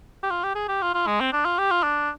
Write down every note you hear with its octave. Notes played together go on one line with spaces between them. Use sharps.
G4
F4
G4
G#4
G4
F4
F4
G#3
C4
D4
F4
G4
F4
D4